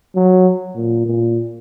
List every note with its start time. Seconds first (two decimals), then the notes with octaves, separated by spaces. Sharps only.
0.15 F#3
0.75 A#2
1.06 A#2